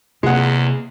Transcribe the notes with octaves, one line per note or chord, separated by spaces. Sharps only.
E2 C3 G#3 A#3 F#5